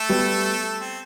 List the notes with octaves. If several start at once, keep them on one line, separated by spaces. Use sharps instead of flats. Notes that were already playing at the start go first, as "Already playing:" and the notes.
Already playing: A3 A4
G3 B3
C4